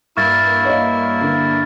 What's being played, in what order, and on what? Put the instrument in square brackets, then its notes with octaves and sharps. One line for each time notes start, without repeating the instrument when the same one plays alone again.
[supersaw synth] G2 A#3 [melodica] E4 [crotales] C#6 F6 A6
[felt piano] C#5 D#5 F5
D3